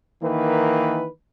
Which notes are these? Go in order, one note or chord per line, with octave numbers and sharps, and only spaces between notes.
D#3 E3 A#3 B4